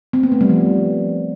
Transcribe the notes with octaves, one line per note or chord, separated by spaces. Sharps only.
C4
B3
A3
G3
F3